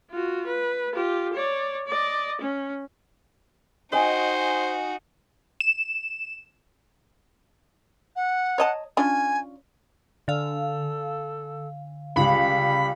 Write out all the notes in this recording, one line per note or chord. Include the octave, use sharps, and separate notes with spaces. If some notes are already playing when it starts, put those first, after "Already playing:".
F4 F#4
B4
F4 G4
C#5 D5
D5 D#5
C#4
D#4 F#4 C5 D#5 G5 G#5
E7
F#5
C#5 D#5 A5
C#4 D4 F4 G#5
D3 A4 F5
C#2 G3 B5